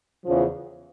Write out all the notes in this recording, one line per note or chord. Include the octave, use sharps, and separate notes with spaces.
E2 C#3 F3